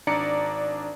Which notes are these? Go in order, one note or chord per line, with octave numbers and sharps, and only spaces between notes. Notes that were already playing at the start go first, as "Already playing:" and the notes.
G#1 D4 D5 A#5 C#7